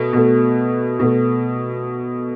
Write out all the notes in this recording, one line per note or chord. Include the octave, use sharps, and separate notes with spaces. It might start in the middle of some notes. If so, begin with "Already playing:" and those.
Already playing: B2 A3
B2 A3
B2 A3